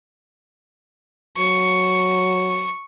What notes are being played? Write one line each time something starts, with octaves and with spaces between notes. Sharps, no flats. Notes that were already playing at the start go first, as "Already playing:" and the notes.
F#3 C#6